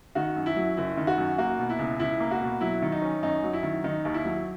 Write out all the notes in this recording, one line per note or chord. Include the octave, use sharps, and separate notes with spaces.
D#3 F#4
F#2
E4
F#3
F#1 E4
D#3
F#4
F#2
A#3 F#4
B2
E4
C#2
C#2 E4
A#3
F#4
B2
F#3 E4
D#3
D#4
C#4
F#2 D#4
F#3
E4
D#3
D#3 D#4
D#2
E4
F#3